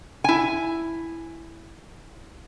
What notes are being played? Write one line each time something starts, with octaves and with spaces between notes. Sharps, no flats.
E4 G#5